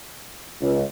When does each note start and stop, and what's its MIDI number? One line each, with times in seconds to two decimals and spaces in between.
0.61 0.83 37